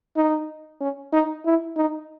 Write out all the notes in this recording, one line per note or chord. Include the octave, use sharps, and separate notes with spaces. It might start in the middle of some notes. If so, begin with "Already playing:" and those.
D#4
C#4
D#4
E4
D#4